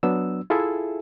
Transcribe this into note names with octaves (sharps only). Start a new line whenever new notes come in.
F#3 B3 D4 E6
E4 F4 G#4 A4 E5